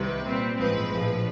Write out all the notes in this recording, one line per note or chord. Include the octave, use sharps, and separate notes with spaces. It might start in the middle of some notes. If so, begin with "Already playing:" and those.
Already playing: C2 C3 D#3 B4
A#2 G3 C4
A1 G#2 F3 G#3 C4 B4
A#1 A2 F3